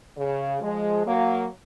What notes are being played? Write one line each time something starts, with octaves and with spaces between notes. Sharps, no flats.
C#3
F3 G#3
F#3 A#3